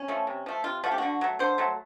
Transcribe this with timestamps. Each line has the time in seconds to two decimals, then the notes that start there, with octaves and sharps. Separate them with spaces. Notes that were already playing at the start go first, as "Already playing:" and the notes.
Already playing: C#4
0.08 F3 A3
0.27 C3
0.46 F3 A3
0.64 C3 F4
0.84 F3 A3 F#4
0.91 G4
0.98 D3 F#4
1.21 F#3 A3
1.39 D3 C5
1.58 F#3 A3